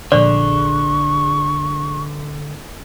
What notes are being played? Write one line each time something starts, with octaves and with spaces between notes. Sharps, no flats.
A#1 D3 G#4 D5 C#6 F#6